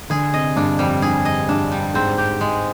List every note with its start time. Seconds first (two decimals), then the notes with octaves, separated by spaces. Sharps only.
0.10 D3 G#4
0.33 C3 D#5
0.56 G2 D4
0.79 F2 G3
1.02 G2 G#4
1.25 D#5
1.48 G2 D4
1.72 G3
1.94 G#2 C4
2.18 G4
2.41 G#3